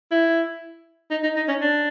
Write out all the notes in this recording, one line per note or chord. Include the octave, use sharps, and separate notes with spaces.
E4
D#4
D#4
D#4
C#4
D4